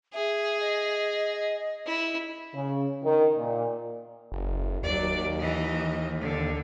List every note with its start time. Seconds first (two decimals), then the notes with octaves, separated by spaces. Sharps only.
0.14 G#4 E5
0.61 D#5
1.87 E4
2.54 C#3
3.03 D#3
3.38 A#2
4.32 F#1
4.83 D#2 F#3 D5
5.40 E3 D#5
6.21 D3